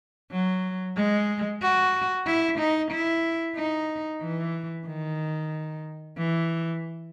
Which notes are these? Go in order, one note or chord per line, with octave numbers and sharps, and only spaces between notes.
F#3
G#3
F#4
E4
D#4
E4
D#4
E3
D#3
E3